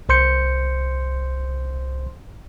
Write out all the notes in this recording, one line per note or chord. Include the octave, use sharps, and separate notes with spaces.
C2 C5 C6 G6 C#7